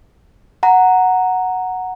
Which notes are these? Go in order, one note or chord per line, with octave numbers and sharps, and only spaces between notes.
F#5 A#5